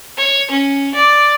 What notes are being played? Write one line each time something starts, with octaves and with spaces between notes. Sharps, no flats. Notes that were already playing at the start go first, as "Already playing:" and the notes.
C#5
C#4
D5